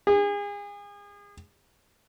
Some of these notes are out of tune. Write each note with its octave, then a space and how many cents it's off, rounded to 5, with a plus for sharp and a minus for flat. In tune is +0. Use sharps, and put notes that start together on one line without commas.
G#4 -35